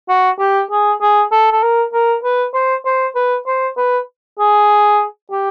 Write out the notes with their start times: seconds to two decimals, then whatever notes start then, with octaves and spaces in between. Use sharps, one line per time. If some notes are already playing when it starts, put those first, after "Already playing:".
0.09 F#4
0.39 G4
0.71 G#4
1.01 G#4
1.32 A4
1.52 A4
1.63 A#4
1.93 A#4
2.24 B4
2.54 C5
2.85 C5
3.15 B4
3.46 C5
3.77 B4
4.39 G#4
5.31 G4